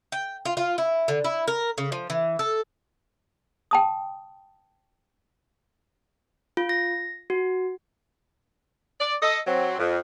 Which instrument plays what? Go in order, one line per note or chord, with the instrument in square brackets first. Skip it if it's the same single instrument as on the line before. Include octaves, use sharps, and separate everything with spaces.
[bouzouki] G5
F4
F4
E4
D3
E4
A#4
C#3
F3
E3
A4
[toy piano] G5 A5 D#6
[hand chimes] F4
A#6
F#4
[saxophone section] D5
A4 D#5
F#3 C4
F2